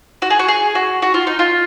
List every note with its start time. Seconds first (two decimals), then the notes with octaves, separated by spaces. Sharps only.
0.22 F#4
0.30 G#4
0.39 F#4
0.48 G#4
0.75 F#4
1.02 F#4
1.14 F4
1.27 D#4
1.39 F4